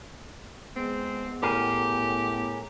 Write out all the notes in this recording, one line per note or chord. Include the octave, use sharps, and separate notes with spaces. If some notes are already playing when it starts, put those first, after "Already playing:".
G#3 B3 C4
A2 G4 G#4 A#4